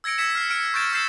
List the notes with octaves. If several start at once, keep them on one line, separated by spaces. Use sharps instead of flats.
E6 G#6 A#6 C#7 D7
E6 G#6 B6 C#7 E7
F6 C7
F6 D7
C#6 G6 A6 D7 E7
E6 G6 A6 C7 E7